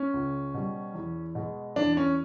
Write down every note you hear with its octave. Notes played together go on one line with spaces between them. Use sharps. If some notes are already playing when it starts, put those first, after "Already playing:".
Already playing: C#4
C#2
B2 G3
E2
B2 G#3
E2 D4
C#4